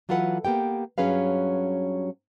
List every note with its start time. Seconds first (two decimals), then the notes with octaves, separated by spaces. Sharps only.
0.09 E3 F#3 F4 A4 B4 F#5
0.45 A#3 B3 G4 G5
0.98 G2 F#3 C#4 G#4 B4 F5